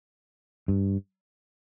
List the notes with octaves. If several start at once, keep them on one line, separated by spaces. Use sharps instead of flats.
G2